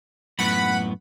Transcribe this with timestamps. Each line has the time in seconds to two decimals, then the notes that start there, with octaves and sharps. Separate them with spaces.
0.39 F#2 A2 B3 F#5 B5